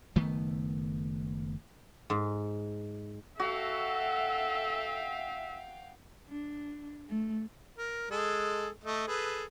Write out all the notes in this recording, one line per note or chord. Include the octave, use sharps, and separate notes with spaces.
F#1 D#3 A3 B3
G#2
F#4 A4 E5 F5 G5
D4
A3
A#4
G#3 G#4 A4
A3 D#5
G#4 A4 B4